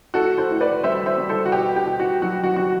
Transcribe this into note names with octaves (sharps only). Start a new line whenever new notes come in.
A2 F#4 A4
A4 C5
A2
B4 D5
G3 C5 E5
C5 E5
G3
A4 C5
F#4
B2 G4
G4
B2
F#4
F#3 F#4
F#4
F#3 F#4